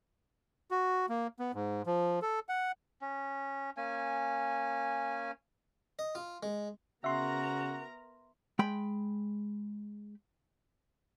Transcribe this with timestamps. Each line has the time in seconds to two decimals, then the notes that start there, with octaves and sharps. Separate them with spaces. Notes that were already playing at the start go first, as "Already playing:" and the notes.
0.71 F#4
1.09 A#3
1.39 B3
1.54 G#2
1.86 F3
2.22 A4
2.49 F#5
3.01 C#4
3.77 A#3 C#4 G#5
5.99 D#5
6.15 F4
6.43 G#3
7.04 C#3 B3 F#4 A#4 E5 A#5 C6
8.59 G#3 G5 B5